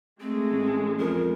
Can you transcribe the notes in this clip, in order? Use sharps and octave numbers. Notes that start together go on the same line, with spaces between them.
G#3 A3 C4
A1
F2 A#4